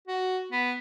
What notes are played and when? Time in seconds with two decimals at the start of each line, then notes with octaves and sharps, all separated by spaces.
0.08 F#4
0.52 B3